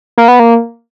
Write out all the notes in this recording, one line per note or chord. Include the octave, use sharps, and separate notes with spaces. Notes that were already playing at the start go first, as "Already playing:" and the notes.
A#3
B3
A#3